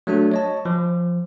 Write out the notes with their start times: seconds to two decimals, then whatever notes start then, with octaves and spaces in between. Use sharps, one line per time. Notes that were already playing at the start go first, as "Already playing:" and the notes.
0.07 F#3 A3 D4 F#4
0.32 C#5 D#5 A5
0.65 F3